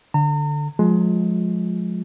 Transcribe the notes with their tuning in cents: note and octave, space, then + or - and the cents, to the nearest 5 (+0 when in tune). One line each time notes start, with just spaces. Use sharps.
D3 +0 A#5 -40
F3 +40 G#3 +25 F4 +20